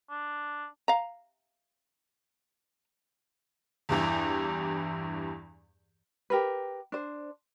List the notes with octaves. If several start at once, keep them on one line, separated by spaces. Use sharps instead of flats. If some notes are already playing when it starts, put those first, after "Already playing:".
D4
F5 A#5
E2 G2 E3 G4
G4 A#4 B4
D4 C5